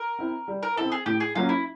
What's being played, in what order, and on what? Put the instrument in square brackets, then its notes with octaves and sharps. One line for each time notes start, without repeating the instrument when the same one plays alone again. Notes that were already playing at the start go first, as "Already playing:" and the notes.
Already playing: [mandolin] A#4
[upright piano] C4 E4
G3
[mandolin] A#4
[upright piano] C4 E4 [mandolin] A4
[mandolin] G#4
[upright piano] A2 [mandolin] G4
[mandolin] G#4
[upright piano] F#3 A#3 C#4 [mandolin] F4
[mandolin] E4